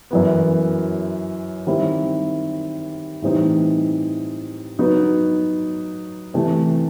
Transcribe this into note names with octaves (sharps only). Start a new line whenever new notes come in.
F#2 E3 B3
D#3 G3 C4 E4
A2 E3 G3 C4 D#4
F#3 B3 D#4 F#4
C3 E3 A3